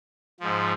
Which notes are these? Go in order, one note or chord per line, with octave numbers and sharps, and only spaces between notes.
G#2 F3